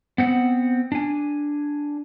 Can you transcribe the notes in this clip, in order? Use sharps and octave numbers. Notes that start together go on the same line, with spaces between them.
B3 C4 F#5
D4 G#5